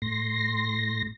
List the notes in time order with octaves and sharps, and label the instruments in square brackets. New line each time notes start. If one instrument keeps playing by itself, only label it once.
[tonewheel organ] A2 C6 A#6